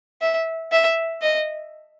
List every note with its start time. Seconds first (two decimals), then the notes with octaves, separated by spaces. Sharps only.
0.21 E5
0.72 E5
1.22 D#5